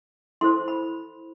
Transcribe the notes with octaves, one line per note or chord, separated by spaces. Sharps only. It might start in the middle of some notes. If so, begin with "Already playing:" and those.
E4 A4 C5 C6
B5